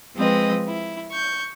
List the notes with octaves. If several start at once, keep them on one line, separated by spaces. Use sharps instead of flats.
F3 G#3 C4 B4 D#5
E4
C#6 G6